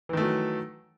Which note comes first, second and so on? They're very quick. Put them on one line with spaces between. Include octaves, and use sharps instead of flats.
E3 D#3 A3 F#3